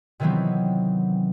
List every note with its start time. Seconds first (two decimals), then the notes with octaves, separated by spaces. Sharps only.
0.20 C3 D#3 E3 F#3 B3 C4